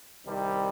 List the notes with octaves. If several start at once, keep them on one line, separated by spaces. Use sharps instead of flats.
C2 C3 D#3 G3